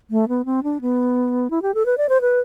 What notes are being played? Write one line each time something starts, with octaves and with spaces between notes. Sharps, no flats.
A3
B3
C4
D4
B3
E4
G4
A4
B4
D5
C5
B4